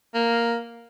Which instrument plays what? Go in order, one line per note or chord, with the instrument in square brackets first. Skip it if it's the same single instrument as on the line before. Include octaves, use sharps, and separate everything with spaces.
[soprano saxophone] A#3